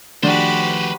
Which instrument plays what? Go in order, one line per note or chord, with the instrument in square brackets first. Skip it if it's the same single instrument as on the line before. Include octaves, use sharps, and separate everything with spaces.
[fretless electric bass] D#3 F3 A3 [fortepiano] D4 [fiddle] F#4 G4 [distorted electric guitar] B4 C5